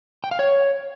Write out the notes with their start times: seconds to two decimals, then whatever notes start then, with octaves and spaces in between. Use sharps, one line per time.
0.24 G5
0.31 F5
0.39 C#5